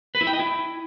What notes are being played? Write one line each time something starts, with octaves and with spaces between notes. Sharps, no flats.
B4
E4
G5
D#5
E4